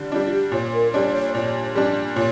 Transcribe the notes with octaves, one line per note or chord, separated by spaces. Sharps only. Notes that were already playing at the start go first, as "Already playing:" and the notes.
Already playing: D3 G3 D4
G3 D4 F4
G4
A#2 C#5
A#4
G3 D4 C#5
C#5
A#2 C#5
G3 D4
A#2 C#5